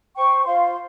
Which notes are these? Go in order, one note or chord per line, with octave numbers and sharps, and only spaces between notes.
C5 G5 C#6
F4 C5 F5 C6